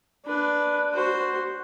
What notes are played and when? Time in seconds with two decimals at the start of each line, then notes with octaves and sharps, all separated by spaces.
0.25 D4 B4
0.93 F#4 C5